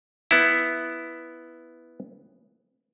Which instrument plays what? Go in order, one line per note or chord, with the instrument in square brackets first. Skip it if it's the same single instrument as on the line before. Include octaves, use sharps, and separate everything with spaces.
[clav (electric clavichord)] B3 E4